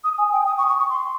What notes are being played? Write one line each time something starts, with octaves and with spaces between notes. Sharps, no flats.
D#6
G#5
G5
D#6
C#6
C#6
C#6
C6